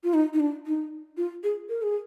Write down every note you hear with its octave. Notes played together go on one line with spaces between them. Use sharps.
F4
D#4
D#4
D4
D#4
F4
G#4
A#4
G#4